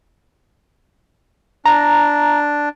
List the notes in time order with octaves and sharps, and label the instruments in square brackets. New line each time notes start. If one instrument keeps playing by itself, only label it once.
[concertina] D4 [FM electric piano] A#5